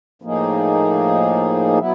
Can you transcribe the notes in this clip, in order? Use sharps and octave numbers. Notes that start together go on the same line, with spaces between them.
A2 F3 A#3 D#4 G#4
B2 F#3 B3 E4